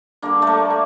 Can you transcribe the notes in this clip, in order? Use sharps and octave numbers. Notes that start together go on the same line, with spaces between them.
D3 G3 A#3
A3
A#3
A3